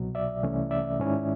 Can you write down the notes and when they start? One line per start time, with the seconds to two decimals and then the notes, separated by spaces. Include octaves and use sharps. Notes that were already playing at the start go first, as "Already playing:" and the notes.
Already playing: C2 B2 F#3
0.15 D5 E5
0.43 C2 C3 E3 A3 C#4
0.71 D5 E5
0.99 G#2 D#3 G#3 C#4 E4